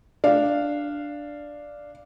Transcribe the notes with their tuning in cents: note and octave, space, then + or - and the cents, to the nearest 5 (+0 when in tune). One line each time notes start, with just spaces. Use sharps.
D4 +0 F5 -10